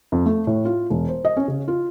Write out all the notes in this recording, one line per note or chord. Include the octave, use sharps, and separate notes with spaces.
F2
A3
A2
F4
E1
C5
D#5
C#4
C#3
F4